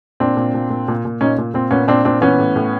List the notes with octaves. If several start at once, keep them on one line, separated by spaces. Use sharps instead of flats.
A#2 C4 D4
A#2
A#2
A#2
A#2
A#2
A#2 C#4 D#4
A#2
A#2 C4
A#2 B3 C#4
A#2 C4 D4
A#2 C4 D4
E3 B3 C#4
A2
A2